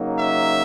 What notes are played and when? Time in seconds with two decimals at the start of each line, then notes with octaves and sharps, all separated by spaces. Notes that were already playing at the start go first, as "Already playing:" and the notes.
Already playing: C#3 F#3 A#3 D#4
0.19 E5